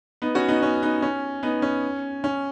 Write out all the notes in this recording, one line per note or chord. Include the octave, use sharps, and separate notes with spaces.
B3 D#4
C#4 F#4
B3 D#4
C#4
B3 D#4
C#4
B3 D#4
C#4
C#4